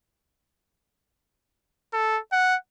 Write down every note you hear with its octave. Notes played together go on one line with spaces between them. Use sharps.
A4
F#5